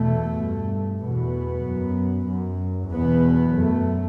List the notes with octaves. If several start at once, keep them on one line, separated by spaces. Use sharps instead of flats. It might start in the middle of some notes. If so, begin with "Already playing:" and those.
Already playing: E2 B2 A3
G2
E2 B2 B3
F#2
F#2
E2 B2 B3
F#2 A3